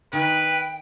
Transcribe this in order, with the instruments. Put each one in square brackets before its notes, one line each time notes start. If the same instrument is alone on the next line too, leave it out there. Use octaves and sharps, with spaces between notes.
[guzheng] D#3 [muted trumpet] B4 [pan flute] G5